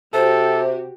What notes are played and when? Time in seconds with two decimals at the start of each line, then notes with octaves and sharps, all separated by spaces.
0.14 C3 F#4 G4 A4 C5